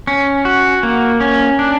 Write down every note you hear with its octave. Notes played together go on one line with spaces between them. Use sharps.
C#4
F#4
A#3
C#4
D4